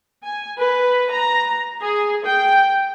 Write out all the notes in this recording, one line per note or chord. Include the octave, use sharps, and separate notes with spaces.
G#5
B4
A#5
G#4
G5